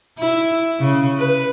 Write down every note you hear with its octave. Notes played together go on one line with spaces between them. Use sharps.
E4
C#3
B4